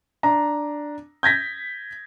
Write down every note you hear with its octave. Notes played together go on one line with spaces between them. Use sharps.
D4 A#5
G6 G#6 A#6 B6